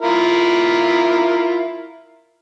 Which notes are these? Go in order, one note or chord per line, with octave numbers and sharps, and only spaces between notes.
E4 F4 A#4